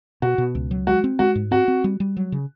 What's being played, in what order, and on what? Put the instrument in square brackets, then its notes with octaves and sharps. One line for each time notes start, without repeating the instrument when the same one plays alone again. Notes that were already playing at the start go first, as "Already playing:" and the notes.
[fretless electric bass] B2 [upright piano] F#4
[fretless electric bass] B2
C#2
F#3
[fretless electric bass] G#3 [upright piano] F#4
[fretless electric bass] C4
[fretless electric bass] G#3 [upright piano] F#4
[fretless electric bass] G#2
[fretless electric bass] C4 [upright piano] F#4
[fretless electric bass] C4
G3
G3
F#3
C#3